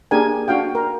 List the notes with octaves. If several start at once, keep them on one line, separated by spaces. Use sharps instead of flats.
A#3 D4 G4 G#4 A#4 G#5
D4 F#4 F5 G5
A#4